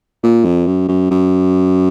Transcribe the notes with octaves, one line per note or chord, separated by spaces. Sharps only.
A#2
F2
F#2
F#2
F#2